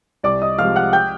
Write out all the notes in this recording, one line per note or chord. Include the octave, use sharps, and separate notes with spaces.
C2 D5 D6
D#5 D#6
C3 F3 G#3 F5 F6
F#5 F#6
G5 G6